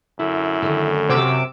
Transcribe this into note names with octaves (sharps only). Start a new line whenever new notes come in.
F#2 D3 E4
D3 D#3 A3
C3 F#4 D6 E6